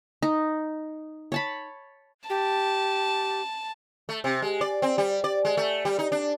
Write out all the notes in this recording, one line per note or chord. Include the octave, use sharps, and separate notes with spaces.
D#4
C#5 A5 B5
G4 A5
A3
C3
G#3
D5
C4
G3
D5
G#3
A3
G3
D#4
D4